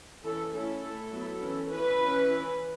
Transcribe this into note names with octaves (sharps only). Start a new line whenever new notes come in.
E3 C#4 E4 A4
A3 C#4 E4 A4
A3 E4
F#3 B3 E4
E3 C#4 E4
E3 C#4 E4 B4
E3 C#4 E4
E3 C#4 E4